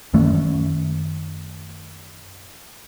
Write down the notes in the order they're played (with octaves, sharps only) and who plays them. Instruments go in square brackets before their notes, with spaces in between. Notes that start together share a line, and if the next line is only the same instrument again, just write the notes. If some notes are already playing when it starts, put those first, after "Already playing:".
[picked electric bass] F#2 D#3 A3 C#4